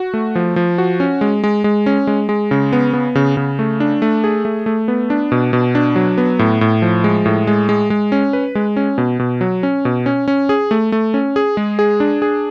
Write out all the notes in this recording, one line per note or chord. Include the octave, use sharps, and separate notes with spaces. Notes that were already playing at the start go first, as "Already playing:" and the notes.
Already playing: F#4
A3
F3
F3
F#4
C#4
G#3
G#3
G#3
C#4
G#3
G#3
C#3
B3
B3
C#3
C#3
A3
D4
A3
G#4
A3
A3
B3
D4
B2
B2
D4
F#3
B3
A2
A2
F3
G#3
A2
G#3
G#3
G#3
C#4
B4
G#3
C#4
B2
B2
F#3
C#4
B2
C#4
C#4
G#4
A3
A3
C#4
G#4
G#3
G#4
D4
G#4